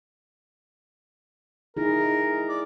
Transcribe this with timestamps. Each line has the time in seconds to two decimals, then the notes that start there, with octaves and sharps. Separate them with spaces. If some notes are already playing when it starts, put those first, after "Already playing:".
1.77 D#4 E4 G#4 A#4
2.49 D5